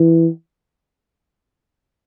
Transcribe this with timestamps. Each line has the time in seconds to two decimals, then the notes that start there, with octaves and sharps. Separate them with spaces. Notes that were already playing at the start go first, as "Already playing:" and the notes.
Already playing: E3